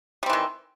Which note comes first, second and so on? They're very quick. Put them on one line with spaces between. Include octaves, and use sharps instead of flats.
G3 C4 E3 D#3